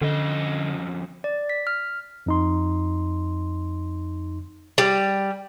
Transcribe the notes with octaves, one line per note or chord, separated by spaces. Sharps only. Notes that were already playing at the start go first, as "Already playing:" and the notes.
F2 D3 C#4 D#5
D5
B6
F6
F2 D#4 C6
G3